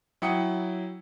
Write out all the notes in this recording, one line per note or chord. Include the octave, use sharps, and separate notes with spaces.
F#3 E4 F#5 G5 D#6 C#7